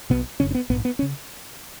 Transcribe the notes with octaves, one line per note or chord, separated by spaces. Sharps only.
B1 B2 B3
F#1 F#2 C#3 C#4
C#4
B3
A#1 G#2 B3
B3
C#4
C#3